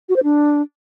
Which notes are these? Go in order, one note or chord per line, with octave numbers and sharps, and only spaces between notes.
F#4
C5
D4